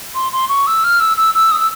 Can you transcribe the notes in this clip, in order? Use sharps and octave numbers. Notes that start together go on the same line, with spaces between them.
C6
C6
C#6
E6
F6
E6
E6
E6
D#6
E6